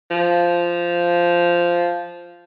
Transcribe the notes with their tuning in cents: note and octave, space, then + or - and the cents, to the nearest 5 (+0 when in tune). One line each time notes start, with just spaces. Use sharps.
F3 -10